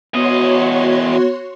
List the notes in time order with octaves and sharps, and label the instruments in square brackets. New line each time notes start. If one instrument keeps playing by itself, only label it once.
[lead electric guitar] E2 D#5 [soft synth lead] B3 [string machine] F#4 C#5 C6